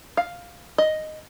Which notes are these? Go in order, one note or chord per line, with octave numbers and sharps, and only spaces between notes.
F5
D#5